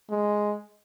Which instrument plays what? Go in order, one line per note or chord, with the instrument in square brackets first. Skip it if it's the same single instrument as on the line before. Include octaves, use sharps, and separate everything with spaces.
[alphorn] G#3